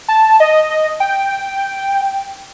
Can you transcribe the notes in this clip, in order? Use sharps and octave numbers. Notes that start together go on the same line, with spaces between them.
A5
D#5
G5